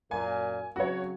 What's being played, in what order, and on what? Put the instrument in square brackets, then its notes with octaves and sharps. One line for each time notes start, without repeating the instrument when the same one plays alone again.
[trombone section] F#2 A#2 [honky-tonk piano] G#5
[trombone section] C#3 F#3 C4 [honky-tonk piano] F#4 C#5